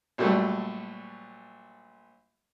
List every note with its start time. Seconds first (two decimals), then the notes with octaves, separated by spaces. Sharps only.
0.18 A#1 F#3 G3 A3